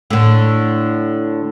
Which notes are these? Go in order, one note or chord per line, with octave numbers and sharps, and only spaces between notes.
A2 D3